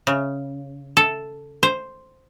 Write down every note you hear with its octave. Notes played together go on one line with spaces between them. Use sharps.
C#3
A4
C5